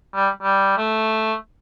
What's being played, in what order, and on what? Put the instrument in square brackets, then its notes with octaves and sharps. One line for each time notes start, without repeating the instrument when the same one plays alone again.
[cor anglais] G3
G3
A3